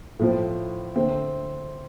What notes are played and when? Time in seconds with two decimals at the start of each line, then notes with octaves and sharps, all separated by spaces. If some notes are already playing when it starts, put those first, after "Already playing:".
0.19 A2 F3 C4
0.96 D3 A3 C4